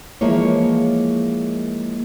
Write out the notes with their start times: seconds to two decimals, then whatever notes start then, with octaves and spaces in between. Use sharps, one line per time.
0.21 E3 F3 G#3 A#3 C#5